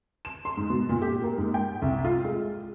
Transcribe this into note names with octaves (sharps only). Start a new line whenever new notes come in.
E7
C6
G#2
B2
A#2
G4
A#3
G#2
G5
C2
F4
G#3